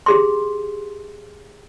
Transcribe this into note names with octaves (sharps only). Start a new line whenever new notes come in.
G4 G#4 C6